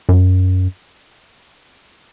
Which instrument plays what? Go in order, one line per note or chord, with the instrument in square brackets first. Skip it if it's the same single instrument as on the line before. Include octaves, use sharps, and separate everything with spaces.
[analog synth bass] F#2